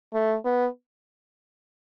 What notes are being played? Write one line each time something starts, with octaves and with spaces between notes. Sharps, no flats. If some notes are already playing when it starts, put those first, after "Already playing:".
A3
B3